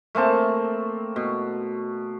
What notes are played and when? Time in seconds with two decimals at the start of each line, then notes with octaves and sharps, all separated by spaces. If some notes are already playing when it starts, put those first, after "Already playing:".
0.15 A3 A#3 C4 A5
1.16 B2